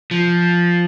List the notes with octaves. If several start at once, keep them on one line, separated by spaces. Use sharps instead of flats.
F3